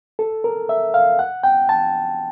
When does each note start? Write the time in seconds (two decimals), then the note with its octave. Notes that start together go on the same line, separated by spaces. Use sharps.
0.19 A4
0.44 A#4
0.69 E5
0.94 F5
1.19 F#5
1.44 G5
1.69 A5